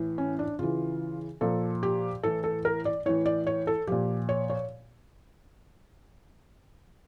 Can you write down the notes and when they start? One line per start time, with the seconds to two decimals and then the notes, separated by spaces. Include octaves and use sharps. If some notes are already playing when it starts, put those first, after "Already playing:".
Already playing: A2 E3
0.18 C#4
0.39 D4
0.59 C#3 E3 F4
1.41 A#2 F3 A4
1.83 G4
2.23 A2 E3 A4
2.44 A4
2.65 A#4
2.85 D5
3.06 A2 E3 C#5
3.26 D5
3.47 C#5
3.67 A4
3.87 A#2 F3 G4
4.29 C#5
4.50 C#5